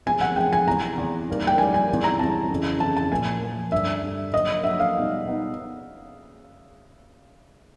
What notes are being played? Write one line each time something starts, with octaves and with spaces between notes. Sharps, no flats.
C3 F3 G#3 B3 G#5
F#5
C3 F3 G#3 B3 G5
G#5
E2 C3 E3 A#5
E2 C3 E3
D#3 G3 A#3
G5
D#3 G3 A#3 G#5
G#5
E2 C3 E3 G3
A#5
E2 C3 E3 G3 A5
F2 C#3 E3
F2 C#3 E3 A5
A5
A#2 F3 A#3 G#5
A#2 F3 A#3
G2 D3 G3 E5
G2 D3 G3
D3 F#3 A#3 D#5
D3 F#3 A#3 E5
F5
B2 G3 B3 D#4
B2 G3 B3 D#4